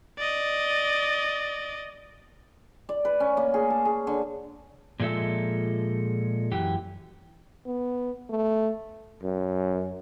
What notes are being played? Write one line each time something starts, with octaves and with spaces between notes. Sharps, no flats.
D5 D#5
D5
B4
C#4
A#3
G#4
A5
G#4
D3
A#2 F3 G#3 A4 E5
F#2 E3 G4
B3
A3
F#2